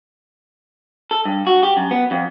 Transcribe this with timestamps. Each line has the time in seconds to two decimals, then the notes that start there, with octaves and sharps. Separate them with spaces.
1.11 A4
1.25 G2
1.47 F#4
1.63 G4
1.77 F#2
1.91 B3
2.11 F2